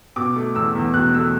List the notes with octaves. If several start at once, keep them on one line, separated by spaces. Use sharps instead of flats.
B2 D6
A3
E2 E6
E2
B2 F#6
A3 E6